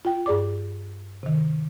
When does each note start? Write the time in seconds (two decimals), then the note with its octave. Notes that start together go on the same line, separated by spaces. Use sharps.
0.05 F4 G5
0.26 G2 G#4 D5 D6
1.23 C3 D#3